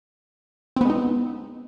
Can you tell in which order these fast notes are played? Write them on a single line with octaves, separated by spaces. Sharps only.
C4 B3 G#3 D#4